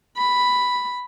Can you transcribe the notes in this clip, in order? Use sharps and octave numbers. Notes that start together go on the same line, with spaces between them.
B5